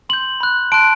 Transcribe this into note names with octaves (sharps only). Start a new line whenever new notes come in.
C6 G6 F#7
B5 F#6
A5 C6 F#6 D7